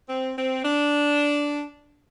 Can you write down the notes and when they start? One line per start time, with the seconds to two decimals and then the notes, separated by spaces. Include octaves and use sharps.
0.09 C4
0.36 C4
0.64 D4